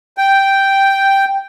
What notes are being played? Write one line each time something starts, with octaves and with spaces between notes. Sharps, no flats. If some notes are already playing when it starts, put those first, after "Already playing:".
G5